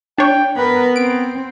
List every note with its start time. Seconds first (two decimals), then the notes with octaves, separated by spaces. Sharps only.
0.18 D4 C#5 G5
0.57 B3 A#4 B4
0.96 C4 D7